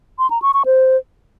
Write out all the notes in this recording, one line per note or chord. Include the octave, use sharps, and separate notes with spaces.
C6
A#5
C#6
C#6
C5